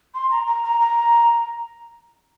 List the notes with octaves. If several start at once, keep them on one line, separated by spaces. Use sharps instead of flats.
C6
A#5
A#5
A#5
A#5